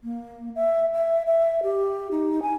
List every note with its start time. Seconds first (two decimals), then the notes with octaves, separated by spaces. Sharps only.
0.04 A#3
0.55 E5
0.94 E5
1.27 E5
1.63 G4
2.11 D#4
2.42 G#5